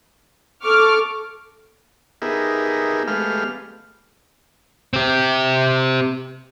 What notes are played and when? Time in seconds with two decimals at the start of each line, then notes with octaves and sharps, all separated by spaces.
0.64 A4 C#6 D6 F6
2.22 B3 D#4 G4 G#4 A#4 E5
3.07 G#3 A3 B3 G4 F5 F6
4.93 C4 G4